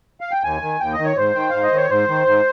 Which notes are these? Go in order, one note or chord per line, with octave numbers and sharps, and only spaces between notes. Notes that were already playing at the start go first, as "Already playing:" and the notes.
F5
G5
D#2 G#5
D#3
D#2 G5
D#5
D#3
C#5
G#2 C5
D#3 G5
G#2 F5
D#5
D#3 C#5
G#2 C5
D#3
G#2